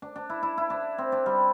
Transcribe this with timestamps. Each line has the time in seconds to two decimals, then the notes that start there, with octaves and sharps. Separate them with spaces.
0.02 D4
0.16 D4
0.30 E4
0.43 E4
0.58 E4
0.70 D4
0.98 C4
1.12 D4
1.26 G3